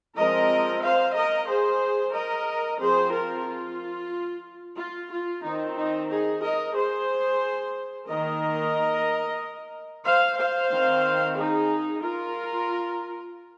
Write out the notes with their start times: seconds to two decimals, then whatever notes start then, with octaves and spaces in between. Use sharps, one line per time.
0.17 F3 G#3 C4 A#4 D#5
0.83 C5 F5
1.16 A#4 D#5
1.48 G#4 C5
2.14 A#4 D#5
2.80 F3 C4 G#4 C5
3.13 F4 A#4
3.46 F4
4.78 F4
5.11 F4
5.44 D#3 C4 D#4
5.77 D#4
6.10 D#4 G#4
6.43 A#4 D#5
6.75 G#4 C5
8.07 D#3 A#3 A#4 D#5
10.05 C5 F5
10.38 C5 F5
10.72 D#3 C4
11.37 D#4 G#4
12.03 F4 A#4